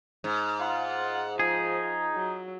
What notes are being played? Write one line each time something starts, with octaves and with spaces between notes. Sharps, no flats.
G#2
F4 F#5
F3 D#4 G#4
F#3